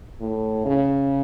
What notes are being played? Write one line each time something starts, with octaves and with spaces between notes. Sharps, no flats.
A2
C#3